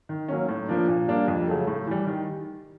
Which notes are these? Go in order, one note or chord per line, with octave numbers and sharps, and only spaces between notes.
D#3
F#3 A#3 C#4
A2
F3 A#3 D4
A#2
G3 A#3 D4
F2
C#3 F#3 A3
A2
E3 G3
D#3